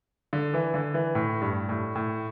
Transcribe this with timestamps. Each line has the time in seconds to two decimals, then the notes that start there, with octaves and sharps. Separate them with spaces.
0.33 D3
0.54 E3
0.74 D3
0.94 E3
1.15 A2
1.41 G2
1.69 A2
1.95 A2